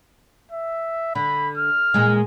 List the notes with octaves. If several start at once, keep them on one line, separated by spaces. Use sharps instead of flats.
E5
D3 B5
F6
E2 A#2 G#3